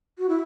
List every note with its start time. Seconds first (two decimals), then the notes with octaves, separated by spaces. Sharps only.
0.19 F#4
0.29 E4